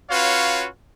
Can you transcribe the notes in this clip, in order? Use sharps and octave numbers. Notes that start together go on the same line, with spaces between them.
C#4 F4 F#4 B4 C#5 F5